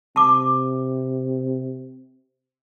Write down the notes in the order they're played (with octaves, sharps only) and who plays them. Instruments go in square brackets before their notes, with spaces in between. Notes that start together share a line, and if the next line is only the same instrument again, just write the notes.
[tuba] C3 [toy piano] A5 D6